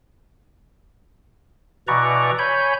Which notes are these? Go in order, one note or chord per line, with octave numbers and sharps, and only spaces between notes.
B2 E3 B4 D5 A#5 C#6
C#5 G#5 B5 G6